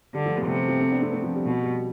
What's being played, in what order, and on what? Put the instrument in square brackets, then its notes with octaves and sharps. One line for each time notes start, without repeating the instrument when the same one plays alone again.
[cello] D3 [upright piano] G3
[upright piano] F3 A3
G3 B3
[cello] C3 [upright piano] A3 C4
[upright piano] G3
F3
A3 C4
B3 D4
A3 C4
A3 C4
F3 A3
G3
[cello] B2
[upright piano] G3